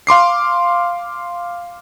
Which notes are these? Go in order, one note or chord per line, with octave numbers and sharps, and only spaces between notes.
F5 C6 D6 C7